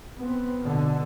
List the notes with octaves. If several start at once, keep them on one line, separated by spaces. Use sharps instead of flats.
B3 C4
B2 D3